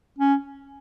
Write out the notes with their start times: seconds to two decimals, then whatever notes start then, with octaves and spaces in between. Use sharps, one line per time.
0.19 C#4